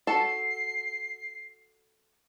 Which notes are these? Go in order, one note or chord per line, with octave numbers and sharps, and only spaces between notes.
F#4 A4 A5 C7